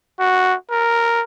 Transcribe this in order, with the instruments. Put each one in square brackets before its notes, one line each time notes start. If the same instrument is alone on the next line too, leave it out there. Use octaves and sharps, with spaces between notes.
[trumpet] F#4
A#4